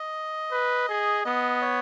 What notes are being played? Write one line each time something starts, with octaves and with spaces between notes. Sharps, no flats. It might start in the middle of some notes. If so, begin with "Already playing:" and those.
Already playing: D#5
B4
G#4
B3 D#5
C#5